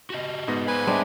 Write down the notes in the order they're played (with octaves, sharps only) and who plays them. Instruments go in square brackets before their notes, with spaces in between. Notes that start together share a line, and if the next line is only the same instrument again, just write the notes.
[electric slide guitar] F#4 G4 D#5
[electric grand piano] G#2 B3 A#6
[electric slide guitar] G#4 C5 D5 [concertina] B4 G#5
[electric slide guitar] G3 E5 [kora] G#3 C4 D4